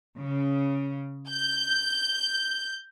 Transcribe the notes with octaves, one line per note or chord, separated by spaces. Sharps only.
C#3
G6